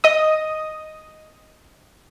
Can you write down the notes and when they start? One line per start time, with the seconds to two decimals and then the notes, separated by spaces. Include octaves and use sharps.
0.04 D#5 D#6